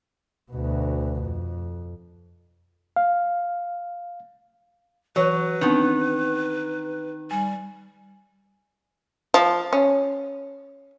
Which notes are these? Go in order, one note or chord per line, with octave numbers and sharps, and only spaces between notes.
D2 B2
F2
F5
E3 F#3 B4 C#5
D#3 B3 C4 D4
G3 G#5
F3
C#4